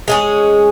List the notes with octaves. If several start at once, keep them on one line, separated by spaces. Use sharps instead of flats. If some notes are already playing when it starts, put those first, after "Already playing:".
G#3 C#4 G#4